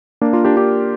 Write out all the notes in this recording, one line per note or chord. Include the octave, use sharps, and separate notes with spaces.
A#3 D4
F4 A#4
D4 G4
D4 G4